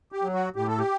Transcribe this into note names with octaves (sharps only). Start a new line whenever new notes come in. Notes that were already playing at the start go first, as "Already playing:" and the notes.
G4
F#3
F#4
A2 G4
A4
G4